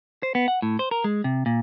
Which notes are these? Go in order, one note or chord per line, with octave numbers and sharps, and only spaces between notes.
C5
B3
F#5
A2
C5
A#4
G#3
C3
A#2